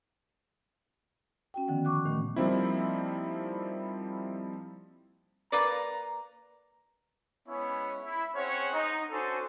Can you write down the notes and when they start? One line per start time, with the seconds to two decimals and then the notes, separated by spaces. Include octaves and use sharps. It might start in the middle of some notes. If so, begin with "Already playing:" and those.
1.54 C#4 F#4 G5
1.68 D3 D#3 F3 B3 F#5
1.85 C#6 D6 F#6
2.05 A#2 D#3 A3
2.36 F3 G3 A#3 C4 D#4 E4
5.52 A#3 B4 D5 A#5
7.47 G#3 B3 C#4 E4 C#5
8.03 E4
8.34 C4 C#4 G#4 C5 C#5 F#5
8.72 D#4
9.11 C#4 D4 F#4 A4 C5 G#5